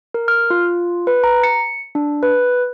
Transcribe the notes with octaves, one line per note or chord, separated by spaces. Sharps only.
A#4
F6
F4
B4
A#5
C#7
D4
B4